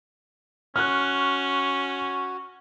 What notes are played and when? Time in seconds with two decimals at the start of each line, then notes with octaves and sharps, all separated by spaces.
0.76 C#4 F#4 F6 F#6